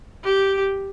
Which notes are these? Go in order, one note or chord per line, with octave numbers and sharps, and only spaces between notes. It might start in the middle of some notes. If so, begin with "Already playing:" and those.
G4